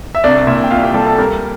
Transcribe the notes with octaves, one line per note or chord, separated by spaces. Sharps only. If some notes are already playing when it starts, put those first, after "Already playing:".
E5
C2 D4 D5
A#2 E4 E5
G5
C2 F4 F5
G4 G5
G3 A4 A5
A4 A5
G3 A#3 A#4